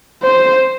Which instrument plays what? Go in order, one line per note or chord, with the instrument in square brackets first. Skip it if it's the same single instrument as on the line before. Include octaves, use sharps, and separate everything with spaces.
[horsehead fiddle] C5